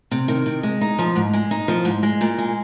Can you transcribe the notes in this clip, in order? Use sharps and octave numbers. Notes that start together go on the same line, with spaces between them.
C3
D#3
C3
G#3
D#4
F3
G#2
G#3
D#4
F3
G#2
G#3
A#2
G#3